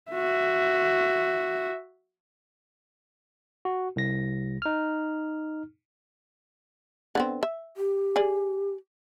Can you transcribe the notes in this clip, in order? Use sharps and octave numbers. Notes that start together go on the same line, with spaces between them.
F#4 E5
F#4
C2 A#6
D#4 F6
D3 B3 C4
E5
G4
G#4 D5